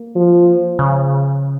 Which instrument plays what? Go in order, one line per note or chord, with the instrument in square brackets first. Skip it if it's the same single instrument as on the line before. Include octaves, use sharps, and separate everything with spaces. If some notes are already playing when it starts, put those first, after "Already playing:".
Already playing: [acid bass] A#3
[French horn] F3
[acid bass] C#3